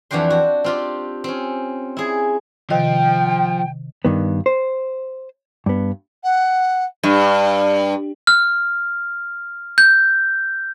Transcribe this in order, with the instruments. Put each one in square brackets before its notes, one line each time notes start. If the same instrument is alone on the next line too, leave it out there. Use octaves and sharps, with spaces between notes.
[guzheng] F2 E3 D4 F#4 G5 C6
F#4
C4 F4 G4
C4 C#4
E4 G#4
[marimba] C3 D#3 D#5 [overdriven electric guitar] F3 [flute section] G5
[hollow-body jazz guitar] G2 D#3 B3
C5
G2 B3
[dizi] F#5
[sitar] G2
[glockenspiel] F6
G6